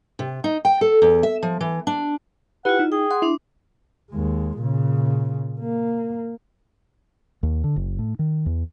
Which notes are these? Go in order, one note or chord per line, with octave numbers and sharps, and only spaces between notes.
C3
D#4
G5
A4
E2
E5
F3
E3
D4
E4 F4 G4 B4 F#5
D#4
G#4 G5
F#5 C6
D4 E4 D6
D#2 G#3
A#2 C#3
A#3
D#2
D3
F#1
A2
D#3
E2